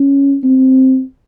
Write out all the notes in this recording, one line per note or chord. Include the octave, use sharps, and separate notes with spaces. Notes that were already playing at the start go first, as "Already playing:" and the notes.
Already playing: C#4
C4